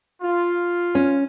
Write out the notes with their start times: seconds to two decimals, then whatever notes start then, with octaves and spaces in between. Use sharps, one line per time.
0.21 F4
0.95 C#4